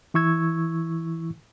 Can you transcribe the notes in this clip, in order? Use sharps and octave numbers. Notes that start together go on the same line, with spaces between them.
E3 E4 C#6 E6 G#6